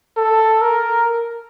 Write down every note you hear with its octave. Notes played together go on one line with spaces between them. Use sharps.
A4
A#4